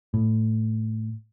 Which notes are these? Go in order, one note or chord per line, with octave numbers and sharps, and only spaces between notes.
A2